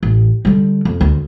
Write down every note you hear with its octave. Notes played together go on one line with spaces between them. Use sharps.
A1
D3 G3
F2
D2